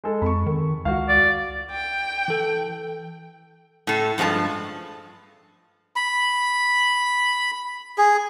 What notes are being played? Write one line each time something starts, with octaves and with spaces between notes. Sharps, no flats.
G#3 A4
F2 B5 C#6
D#3
C#2 F#4 F5
D5
G5
E3 A4
A2 A4
G2 F3 G#3 F#4 A5
B5
G#4